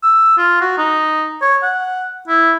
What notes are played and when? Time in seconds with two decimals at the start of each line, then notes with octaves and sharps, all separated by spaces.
0.03 E6
0.37 F4
0.61 F#4
0.78 D#4
1.42 C#5
1.63 F#5
2.28 E4